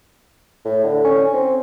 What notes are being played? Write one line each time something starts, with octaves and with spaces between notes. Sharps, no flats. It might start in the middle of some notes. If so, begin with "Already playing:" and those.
A2
D3
C#4
C4